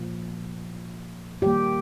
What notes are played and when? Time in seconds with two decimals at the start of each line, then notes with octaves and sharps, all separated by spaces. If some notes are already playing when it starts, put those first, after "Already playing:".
Already playing: A#2 F3 A#3
1.42 D#3 G3 A#3 G4